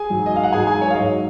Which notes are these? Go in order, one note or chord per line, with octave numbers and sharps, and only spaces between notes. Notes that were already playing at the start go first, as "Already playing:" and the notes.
Already playing: G#4 G#5
G#2 F#3
D#5
F5
F#5
G#2 F#3 G#4 G#5
G#4 G#5
C#5
F5
G#2 F#3 D#5